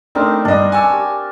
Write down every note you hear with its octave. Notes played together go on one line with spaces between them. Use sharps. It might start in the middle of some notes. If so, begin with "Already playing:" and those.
A3 C4 D4 D#4 A#4
G2 D4 D#5
G#5 C#6 E6
G4